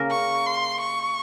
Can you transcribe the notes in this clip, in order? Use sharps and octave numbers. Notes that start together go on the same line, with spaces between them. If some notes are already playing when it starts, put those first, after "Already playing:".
Already playing: C#3 A#3 C#4 A#4
C#6
C6
C#6